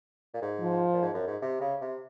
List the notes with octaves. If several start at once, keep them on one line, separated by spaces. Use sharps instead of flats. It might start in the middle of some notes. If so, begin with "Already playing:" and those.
A#2
G#2
F3
A#2
G#2
F#2
G#2
C3
C#3
C3